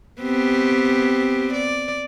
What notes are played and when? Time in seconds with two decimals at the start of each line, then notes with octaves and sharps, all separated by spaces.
0.21 B3 C4 G4
1.53 D5